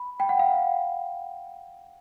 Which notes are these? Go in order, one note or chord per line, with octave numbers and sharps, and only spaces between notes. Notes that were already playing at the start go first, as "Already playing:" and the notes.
Already playing: B5
G5
F#5
F5